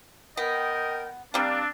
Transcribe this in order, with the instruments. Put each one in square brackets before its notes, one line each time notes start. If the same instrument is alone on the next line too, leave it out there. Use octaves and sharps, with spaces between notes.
[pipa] B3 [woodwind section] A#4 D#5 G5
[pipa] G3 A#3 [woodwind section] C4 D4